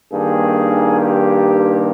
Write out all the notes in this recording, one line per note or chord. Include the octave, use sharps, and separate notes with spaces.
G2 D#3 A#3 G#4
G4